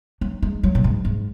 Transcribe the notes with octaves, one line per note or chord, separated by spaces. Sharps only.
F#3
G#3
F#3
A#2
G#2
G#2